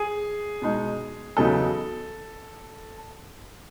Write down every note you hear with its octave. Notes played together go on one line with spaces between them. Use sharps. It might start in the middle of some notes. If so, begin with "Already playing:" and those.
Already playing: G#4
B2 G#3 D#4
E2 C#3 F#3 B3 D#4 A4